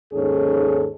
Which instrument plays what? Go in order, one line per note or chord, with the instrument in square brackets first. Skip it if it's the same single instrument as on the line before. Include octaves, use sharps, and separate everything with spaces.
[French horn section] D#2 G#2 C#4 G#4 A4